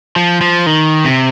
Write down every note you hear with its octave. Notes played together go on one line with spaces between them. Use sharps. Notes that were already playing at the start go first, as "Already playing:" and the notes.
F3
F3
D#3
C3